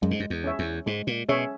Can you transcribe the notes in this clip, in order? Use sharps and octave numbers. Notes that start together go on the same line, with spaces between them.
F#2 G#3
G#2
F#2
E2
C#4 G#4 C#5 E5
E2
G#2 G#3
A#2
B2 C#4 G#4 C#5 E5